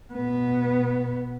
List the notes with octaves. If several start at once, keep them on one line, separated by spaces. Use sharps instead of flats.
B2 B3